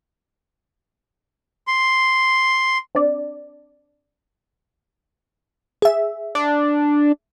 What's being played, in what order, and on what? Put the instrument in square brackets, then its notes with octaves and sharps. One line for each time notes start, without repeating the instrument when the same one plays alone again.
[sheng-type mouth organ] C6
[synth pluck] C4 D4 D5
[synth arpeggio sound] G#4 E5
[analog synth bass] D4